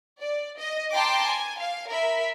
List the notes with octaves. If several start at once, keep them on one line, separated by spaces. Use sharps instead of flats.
D5
D#5
G5 A5 A#5 C6 D6
G#5
F5
A#4 E5 B5